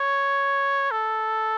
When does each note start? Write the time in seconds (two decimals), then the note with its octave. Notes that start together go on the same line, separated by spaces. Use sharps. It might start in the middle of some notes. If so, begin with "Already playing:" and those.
Already playing: C#5
0.91 A4